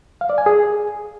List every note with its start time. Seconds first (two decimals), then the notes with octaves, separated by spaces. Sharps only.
0.21 F5
0.30 D5
0.38 G#5
0.46 G#4